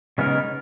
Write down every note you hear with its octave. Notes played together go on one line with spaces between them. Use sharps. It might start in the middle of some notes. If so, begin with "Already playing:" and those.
C#3 G#3 B3 D#4 A#4